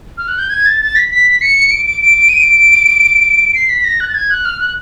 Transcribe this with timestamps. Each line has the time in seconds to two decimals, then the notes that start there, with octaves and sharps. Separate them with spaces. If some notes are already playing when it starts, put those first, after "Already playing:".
0.18 F6
0.28 F#6
0.39 G6
0.50 G#6
0.66 A6
0.81 A6
0.96 B6
1.10 B6
1.41 C#7
1.71 D7
1.86 D7
2.01 D7
2.17 D7
2.29 D#7
2.40 D7
3.55 C7
3.69 B6
3.84 A#6
4.00 F#6
4.09 A6
4.14 G#6
4.30 F#6
4.45 F6
4.60 F#6